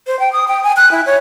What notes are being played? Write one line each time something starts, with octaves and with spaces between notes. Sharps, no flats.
C5
G5
D#6
G5
G#5
F#6
E4
C#5